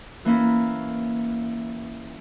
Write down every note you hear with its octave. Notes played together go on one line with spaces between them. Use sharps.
E3 A#3 C#4 E4